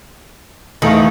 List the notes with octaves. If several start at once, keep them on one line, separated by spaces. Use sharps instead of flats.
E2 D#3 A3 F5